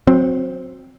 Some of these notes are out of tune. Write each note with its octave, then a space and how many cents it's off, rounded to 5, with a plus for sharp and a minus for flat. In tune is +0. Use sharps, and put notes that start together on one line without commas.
F#3 -20 C4 +0